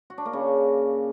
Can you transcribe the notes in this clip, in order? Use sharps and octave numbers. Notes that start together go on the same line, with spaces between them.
F#4
D4
A#3
C#3